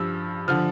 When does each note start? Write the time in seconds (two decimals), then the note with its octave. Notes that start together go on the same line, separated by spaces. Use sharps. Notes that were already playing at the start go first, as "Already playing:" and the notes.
Already playing: G2 F3 E6
0.48 D3 F3 F6